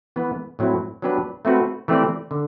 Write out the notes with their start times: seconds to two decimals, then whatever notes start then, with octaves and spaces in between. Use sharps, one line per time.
0.16 E3 B3 E4 B4
0.59 A2 F#3 C4 E4
1.02 F#3 B3 D4 G4 B4
1.45 A3 C4 F#4 B4
1.88 E3 A3 C4 G4 D5
2.31 D3